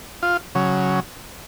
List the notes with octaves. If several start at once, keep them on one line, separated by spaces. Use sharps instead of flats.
F4
C#3 F#3